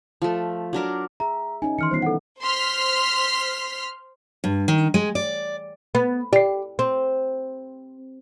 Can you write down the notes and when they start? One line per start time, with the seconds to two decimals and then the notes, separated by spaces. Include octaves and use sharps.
0.22 F3 A3
0.73 F#3 D4 A#4 D6
1.20 G#4 E5 A#5
1.62 C#4 D#4 G#5
1.79 D#3 E3 C6 F6 C#7
1.91 G3 B3 F4 C5 C7
2.02 E4 A4 F#5
2.40 C5 C6 F6 B6
4.44 G2
4.68 D#3
4.94 G#3
5.15 D5
5.95 B3
6.33 G4 D5 C7
6.79 C4